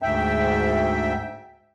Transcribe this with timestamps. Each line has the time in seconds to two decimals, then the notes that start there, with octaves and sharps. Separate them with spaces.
0.02 D2 G#2 E5 G5